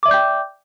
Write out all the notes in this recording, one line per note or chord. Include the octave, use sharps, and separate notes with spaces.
D5 E5 G5 D6 G6